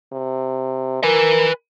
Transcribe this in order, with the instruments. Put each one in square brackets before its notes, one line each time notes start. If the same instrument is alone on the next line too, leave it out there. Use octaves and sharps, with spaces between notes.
[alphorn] C3
[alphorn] A#4 [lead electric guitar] B4 G#5